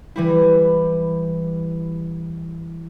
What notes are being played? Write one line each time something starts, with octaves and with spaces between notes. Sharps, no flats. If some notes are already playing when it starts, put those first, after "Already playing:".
E3 G3 E4